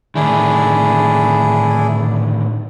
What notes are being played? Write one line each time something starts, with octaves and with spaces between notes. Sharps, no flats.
A2 D3 D#3 D4 E4 G#4